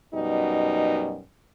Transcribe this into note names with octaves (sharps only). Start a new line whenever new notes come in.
F#2 B2 G3 D#4